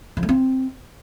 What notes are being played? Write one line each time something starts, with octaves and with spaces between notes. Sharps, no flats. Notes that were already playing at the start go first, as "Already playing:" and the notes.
F3
A3
C4